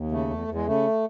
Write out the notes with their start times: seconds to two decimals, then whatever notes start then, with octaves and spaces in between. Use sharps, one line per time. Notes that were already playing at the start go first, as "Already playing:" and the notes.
Already playing: D#2
0.12 C#3 A3
0.30 E2
0.48 E2
0.55 G#3
0.67 C#3 A3